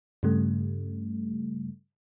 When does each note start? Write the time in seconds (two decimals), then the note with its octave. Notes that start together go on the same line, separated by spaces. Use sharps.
0.23 G2 C#3 G3 A3